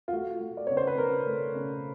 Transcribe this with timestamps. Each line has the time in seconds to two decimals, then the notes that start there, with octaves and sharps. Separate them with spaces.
0.08 F4
0.13 A3 F#4
0.40 A3
0.57 D5
0.67 C#3 C#5
0.77 C5
0.87 B4
0.97 C#3 A#4
1.27 A3
1.55 C#3